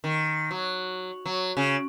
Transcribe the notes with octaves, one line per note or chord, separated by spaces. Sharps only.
D#3
F#3
F#3
C#3